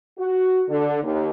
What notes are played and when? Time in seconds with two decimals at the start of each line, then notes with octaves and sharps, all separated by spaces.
0.17 F#4
0.67 D3
1.01 D#2